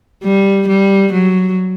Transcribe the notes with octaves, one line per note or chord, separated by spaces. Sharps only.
G3
G3
F#3